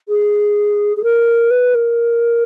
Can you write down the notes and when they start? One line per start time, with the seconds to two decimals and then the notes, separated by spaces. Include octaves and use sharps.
0.08 G#4
0.96 G#4
1.03 A#4
1.50 B4
1.74 A#4